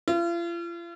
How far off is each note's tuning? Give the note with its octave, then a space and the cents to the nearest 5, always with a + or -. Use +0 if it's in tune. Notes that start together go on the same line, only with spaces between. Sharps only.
F4 -40